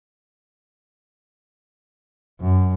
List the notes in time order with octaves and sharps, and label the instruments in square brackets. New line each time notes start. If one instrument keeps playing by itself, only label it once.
[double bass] F#2